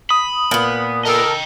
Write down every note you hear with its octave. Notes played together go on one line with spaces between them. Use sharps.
B5 D#6
A#2 B3
A4 A#4 D#5 G5